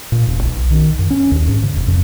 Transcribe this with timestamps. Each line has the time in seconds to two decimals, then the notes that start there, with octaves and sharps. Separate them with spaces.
0.12 A#2
0.27 E1
0.43 B1
0.70 D#3
0.99 F#2
1.10 C#4
1.31 D#2
1.48 G#2
1.63 C#3
1.76 E1
1.88 F2